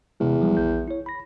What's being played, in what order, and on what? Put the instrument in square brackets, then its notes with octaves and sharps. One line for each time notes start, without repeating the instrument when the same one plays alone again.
[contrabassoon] E2 [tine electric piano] C3 G#3
[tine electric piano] F3 G3 G#3
A#1 G6
E4 C#5
B5 A#6